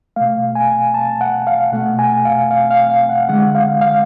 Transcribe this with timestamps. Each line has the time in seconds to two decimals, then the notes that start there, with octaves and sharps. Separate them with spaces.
0.16 B2 A3 F5
0.55 G#5
0.94 A5
1.21 F#5
1.47 F5
1.72 B2 A3 F#5
1.99 G#5
2.25 F5
2.51 F5
2.71 F5
2.90 F5
3.09 F#5
3.29 D3 G#3 F#5
3.55 F5
3.81 F5